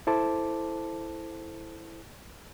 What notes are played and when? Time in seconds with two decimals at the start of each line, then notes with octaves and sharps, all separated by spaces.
0.07 E4 A4 C5 A5 D6